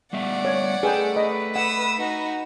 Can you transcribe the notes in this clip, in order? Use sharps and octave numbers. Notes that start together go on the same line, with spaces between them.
G3 B3 D5 E5 F#5
C#5
A3 G#4 B4 G5
B4 D#5
F#5 D#6 E6
D#4 F#4